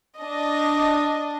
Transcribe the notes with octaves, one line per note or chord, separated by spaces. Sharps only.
D4 D#5